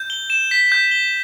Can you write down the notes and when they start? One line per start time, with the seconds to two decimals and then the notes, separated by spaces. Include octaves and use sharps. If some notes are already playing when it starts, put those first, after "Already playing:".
Already playing: G6
0.10 G7
0.30 E7
0.51 B6
0.72 G6
0.91 G7